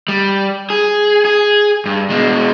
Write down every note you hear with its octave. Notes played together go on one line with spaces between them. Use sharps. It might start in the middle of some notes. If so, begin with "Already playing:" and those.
G3
G#4
G#4
G2
B2 G#3